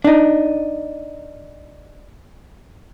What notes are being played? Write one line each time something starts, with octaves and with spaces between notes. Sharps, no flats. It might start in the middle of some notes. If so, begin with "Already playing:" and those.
D4 D#4